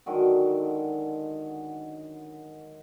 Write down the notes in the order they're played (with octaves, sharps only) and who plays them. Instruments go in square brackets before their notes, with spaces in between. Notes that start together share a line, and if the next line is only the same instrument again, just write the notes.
[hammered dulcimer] D3 D#3 F#3 G#3